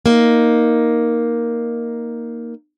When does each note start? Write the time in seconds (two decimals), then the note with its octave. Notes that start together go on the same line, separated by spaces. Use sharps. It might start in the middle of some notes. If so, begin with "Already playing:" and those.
0.06 A#3 D#4